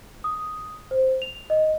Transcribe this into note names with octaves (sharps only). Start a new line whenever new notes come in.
D#6
C5
F7
D#5